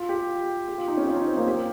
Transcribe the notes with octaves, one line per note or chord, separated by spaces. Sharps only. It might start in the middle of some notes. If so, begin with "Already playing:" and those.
Already playing: F4
G4
G4
F4
D#4
C#4
F4
D#4
C4
A#3
G4